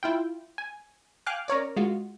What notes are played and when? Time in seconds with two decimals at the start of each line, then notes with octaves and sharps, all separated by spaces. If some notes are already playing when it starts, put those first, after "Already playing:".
0.03 E4 F4 G5
0.58 G#5
1.26 F5 G5 G#5 D6 F6 F#6
1.48 C#4 A#4 C#5 D5
1.76 G#3 F4 F#4